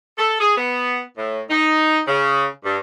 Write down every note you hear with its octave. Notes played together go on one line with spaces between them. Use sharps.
A4
G#4
B3
A2
D#4
C#3
G2